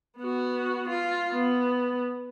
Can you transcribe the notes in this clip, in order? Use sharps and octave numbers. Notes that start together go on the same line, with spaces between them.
B3 F#4
F4
B3